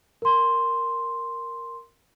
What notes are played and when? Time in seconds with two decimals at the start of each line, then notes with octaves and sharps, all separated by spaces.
0.22 A#4 C6